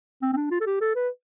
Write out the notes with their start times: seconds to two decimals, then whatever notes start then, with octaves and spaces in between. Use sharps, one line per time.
0.22 C4
0.33 C4
0.36 D4
0.51 F4
0.60 A4
0.66 G4
0.81 A4
0.95 B4